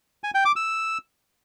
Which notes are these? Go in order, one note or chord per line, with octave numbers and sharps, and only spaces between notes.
G#5
G5
D6
E6